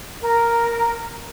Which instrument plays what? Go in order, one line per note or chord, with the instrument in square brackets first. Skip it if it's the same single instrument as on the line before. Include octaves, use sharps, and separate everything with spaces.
[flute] A#4